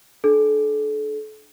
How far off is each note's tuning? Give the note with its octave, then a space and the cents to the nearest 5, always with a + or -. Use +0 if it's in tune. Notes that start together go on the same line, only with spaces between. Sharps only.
D4 +20 A4 -35